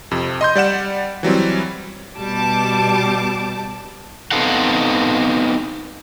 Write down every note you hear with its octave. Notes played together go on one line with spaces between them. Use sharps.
F2 C3
D#5 C6 G6
G3 D5 F#5 E7
E3 F#3 G3 C4
B2 G3 A5 D6
B3 C4 D#4 A4 F5 F#5